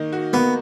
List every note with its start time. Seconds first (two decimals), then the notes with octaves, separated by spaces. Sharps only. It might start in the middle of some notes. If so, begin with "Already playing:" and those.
Already playing: D#3 A#3 D#4
0.12 F#4
0.33 A#3 B3